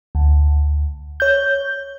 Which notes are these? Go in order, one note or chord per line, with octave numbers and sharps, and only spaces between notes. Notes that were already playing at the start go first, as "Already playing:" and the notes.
D2
C#5 G6